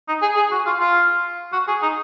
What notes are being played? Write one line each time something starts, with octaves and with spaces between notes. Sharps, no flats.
D#4
G#4
G#4
F#4
F4
F4
F#4
G#4
D#4